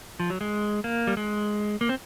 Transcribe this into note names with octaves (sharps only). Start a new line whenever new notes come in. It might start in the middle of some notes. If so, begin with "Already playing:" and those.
F3
F#3
G#3
A#3
G3
G#3
A#3
C4